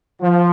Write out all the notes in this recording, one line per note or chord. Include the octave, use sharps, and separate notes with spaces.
F3